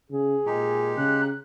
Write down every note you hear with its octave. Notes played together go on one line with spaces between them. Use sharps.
C#3 G#4
A#2 G#3 D#4 G4
C#3 F#6